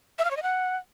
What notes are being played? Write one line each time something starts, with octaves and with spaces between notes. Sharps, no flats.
E5
F5
C#5
D#5
F#5